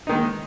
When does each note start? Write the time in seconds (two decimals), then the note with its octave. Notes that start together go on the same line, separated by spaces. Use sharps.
0.07 D#4
0.09 D#3
0.12 G#3